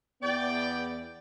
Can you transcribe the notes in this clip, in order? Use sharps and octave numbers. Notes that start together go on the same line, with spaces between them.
E2 B3 D5 G5